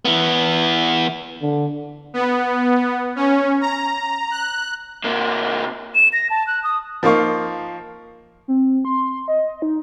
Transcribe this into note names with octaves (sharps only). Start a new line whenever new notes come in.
E3 B3
D3
B3
C#4
A#5
F#6
C3 A#3
E7
A#6
A5
F#6
D#6
F3 A#3 D#4 F4 C#6
C4
C6
D#5
D#4